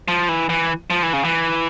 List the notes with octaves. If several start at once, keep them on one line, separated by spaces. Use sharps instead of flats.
F3
E3
E3
F3
E3
C#3
E3